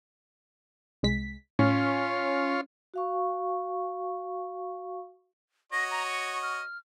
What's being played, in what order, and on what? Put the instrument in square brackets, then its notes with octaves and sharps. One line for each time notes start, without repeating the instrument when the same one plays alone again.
[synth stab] C2 G#3 B6
[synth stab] A2 [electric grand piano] C#4 [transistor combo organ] F4 C#5 C6
[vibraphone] F#4 F5 C#6
[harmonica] F#4 C#5 D#5 [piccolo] A#6
[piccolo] A#5
C#6
F6